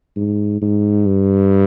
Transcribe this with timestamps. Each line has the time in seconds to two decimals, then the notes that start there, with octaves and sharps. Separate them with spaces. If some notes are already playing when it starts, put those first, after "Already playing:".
0.16 G#2
0.62 G#2
1.06 G2